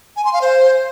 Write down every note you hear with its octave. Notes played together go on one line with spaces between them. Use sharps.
G#5
C6
F5
C5